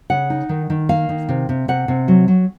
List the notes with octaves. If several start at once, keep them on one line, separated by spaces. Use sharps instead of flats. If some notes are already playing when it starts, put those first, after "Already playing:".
C#3 F#5
D#4
D#3
D#3
A#3 F5
D#3
C3
C3
C3 F#5
C3
F#3
F#3